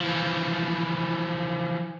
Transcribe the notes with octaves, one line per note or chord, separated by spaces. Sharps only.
E3 F3